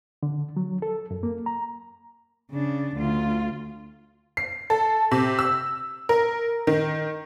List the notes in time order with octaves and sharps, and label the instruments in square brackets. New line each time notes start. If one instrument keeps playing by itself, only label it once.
[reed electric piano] D3
F#3
A4
F#2
A#3
A#5
[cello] C#3 D4
D2 F4
[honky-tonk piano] C7
A4
C3
E6
A#4
D#3